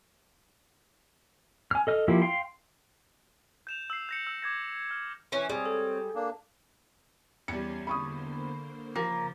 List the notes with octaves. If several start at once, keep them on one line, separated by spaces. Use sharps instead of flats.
G#5 F6
A4 D#5 F6
F3 A#3 E4 F4 G4
F5 G5 C6
G6 E7 F7
E6 C7
G6 A#6 C#7
E6
D6 G#6 A#6
F6
E3 C#4
G3 C4 G#4 C#5
A4
A#3 D4
E2 G3 C#4 C6 C#7
D3 A#3 C5 B5 C#6 D#6
C#3 F3 A#3